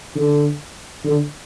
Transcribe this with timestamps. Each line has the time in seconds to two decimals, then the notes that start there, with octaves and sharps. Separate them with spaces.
0.16 D3
1.05 D3